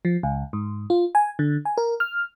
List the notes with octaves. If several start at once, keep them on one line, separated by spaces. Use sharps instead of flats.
F3
C#2
G#2
F4
G#5
D3
G#5
A#4
F6